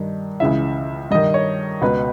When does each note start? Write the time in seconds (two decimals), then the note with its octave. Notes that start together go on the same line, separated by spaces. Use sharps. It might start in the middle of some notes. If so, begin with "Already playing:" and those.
Already playing: G2 D#3
0.40 C#2 C#3 E3 E5
1.11 G2 D#3 D#5
1.34 C#5
1.81 C#2 B2 B4